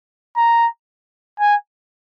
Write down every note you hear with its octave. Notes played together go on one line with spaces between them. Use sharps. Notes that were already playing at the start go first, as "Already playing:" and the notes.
A#5
G#5